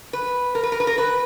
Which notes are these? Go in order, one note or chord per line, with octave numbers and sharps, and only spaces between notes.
B4
A#4
B4
A#4
B4
A#4
B4